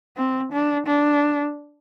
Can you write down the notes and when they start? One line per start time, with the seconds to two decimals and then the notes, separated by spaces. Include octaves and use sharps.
0.16 C4
0.52 D4
0.87 D4